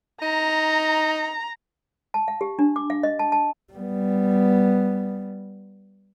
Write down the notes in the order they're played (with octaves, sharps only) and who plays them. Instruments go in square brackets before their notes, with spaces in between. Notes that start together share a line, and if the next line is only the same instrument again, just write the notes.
[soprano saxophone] D#4 [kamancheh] A#5
[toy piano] A5
F5
G4
D4
D6
F5
D#5
A5
A5
[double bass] G3 B3